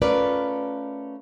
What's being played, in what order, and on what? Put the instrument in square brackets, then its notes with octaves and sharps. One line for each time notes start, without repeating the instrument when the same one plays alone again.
[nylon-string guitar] A3 C#4 F4 A#4 B4 D5